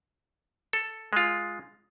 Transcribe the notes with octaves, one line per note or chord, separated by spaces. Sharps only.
A4
G#3 F4